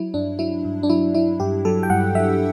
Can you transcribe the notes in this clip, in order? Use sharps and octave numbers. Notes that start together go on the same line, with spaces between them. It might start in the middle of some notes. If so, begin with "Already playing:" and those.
Already playing: F#3 E4
G2 D4
F#3 E4
G2
D4
F#3 E4
F#3 E4
G2 G4
F#3 A4
G5
G2 F#5
F#3 E5